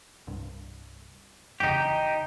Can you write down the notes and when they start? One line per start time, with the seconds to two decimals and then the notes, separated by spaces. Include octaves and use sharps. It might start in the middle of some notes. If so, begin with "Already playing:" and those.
0.27 C2 G2
1.60 G1 E2 C#3 D#4 G4